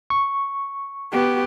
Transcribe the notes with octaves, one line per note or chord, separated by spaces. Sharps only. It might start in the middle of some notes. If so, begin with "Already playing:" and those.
C#6
B3 G4